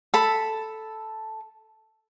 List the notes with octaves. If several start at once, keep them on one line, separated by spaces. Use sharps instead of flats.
A4 B5